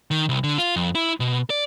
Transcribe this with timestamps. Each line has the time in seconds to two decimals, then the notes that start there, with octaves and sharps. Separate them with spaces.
0.11 D#3
0.29 C2
0.44 D3
0.58 F4
0.76 F2
0.95 E4
1.20 B2
1.50 D5